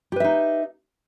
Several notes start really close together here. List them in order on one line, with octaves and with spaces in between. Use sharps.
G4 B4 E5 D#4